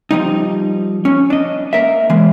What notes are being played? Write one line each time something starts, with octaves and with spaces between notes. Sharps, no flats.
F3 G3 D#4
C#4
D4 D#5
A#3 A#4 E5
E3 G#3 A#3